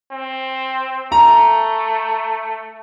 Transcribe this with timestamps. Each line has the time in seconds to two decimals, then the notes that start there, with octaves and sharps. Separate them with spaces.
0.11 C4
1.12 A3 A#5